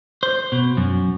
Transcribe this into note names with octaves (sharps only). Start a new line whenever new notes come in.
C5
B2
F#2